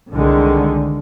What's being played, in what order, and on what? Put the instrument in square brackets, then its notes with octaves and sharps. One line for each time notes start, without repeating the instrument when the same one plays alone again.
[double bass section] C2 D3 D#3 G#3